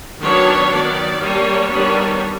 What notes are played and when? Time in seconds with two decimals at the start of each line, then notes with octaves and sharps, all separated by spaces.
0.22 D#3 F#3 B3 D4 C#5
0.71 D#3 F#3 B3 D5
1.20 G3 A#3 D4 C#5
1.69 D#3 G3 B3 D4